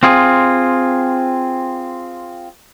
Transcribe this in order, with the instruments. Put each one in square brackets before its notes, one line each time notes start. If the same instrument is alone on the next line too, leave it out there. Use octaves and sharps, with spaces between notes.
[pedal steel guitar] C4 F4 G#4